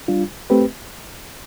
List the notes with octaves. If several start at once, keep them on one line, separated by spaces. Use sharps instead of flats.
G3 D4 F4
A3 C4 G4 B4